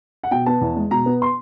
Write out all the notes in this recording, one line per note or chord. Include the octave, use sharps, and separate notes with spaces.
F#5
B2 G5
B3 A5
E2
G#3
B2 A#5
B3
C6